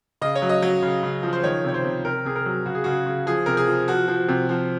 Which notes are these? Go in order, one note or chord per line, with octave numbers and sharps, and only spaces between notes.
C#3 D#5
C#5
F#3
D#5
F#3
C#3
C#3
F3
C5
D#3 C#5
C3 C#5
C5
C3
C3 A#4
C3 G#4
A#4
F#3
C#3 F#4
G#4
C#3 F#4
C#3
F3 G#4
C3 A#4
G#4
F3
F3 F#4
F3
C3
F3